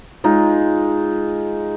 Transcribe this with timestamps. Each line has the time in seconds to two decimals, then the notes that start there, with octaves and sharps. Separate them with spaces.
0.24 G#3 D#4 F4